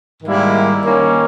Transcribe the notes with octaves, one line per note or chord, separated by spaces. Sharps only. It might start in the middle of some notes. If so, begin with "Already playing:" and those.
G#2 D#3 G3 A#3 E4
D#3 A#3 C#4